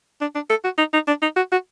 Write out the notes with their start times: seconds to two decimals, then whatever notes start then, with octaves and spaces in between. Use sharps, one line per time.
0.21 D4
0.35 D4
0.50 A4
0.64 F#4
0.78 D#4
0.93 D#4
1.07 D4
1.22 D#4
1.36 F#4
1.52 F#4